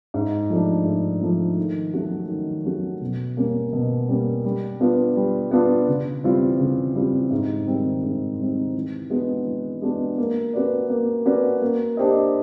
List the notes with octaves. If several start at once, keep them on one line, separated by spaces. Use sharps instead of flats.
G#2
F3 A3 D4
G#2
F3 A3 D4
D#3
F#3 A3 C#4 F#4
D#3
F#3 A3 C#4 F#4
B2
G3 A#3 C#4
B2
G3 A#3 C#4
G3
B3 D4 F4
G3
B3 D4 F4
C#3
E3 G3 C4 F4
C#3
E3 G3 C4 F4
G#2
D#3 G3 C4 D#4
G#2
D#3 G3 C4 D#4
E3
G#3 B3 D4 F#4
E3
G#3 B3 D4 F#4
A#3
C#4 F#4 B4 D5
A#3
C#4 F#4 B4 D5
A#3
D4 G4 C5 D#5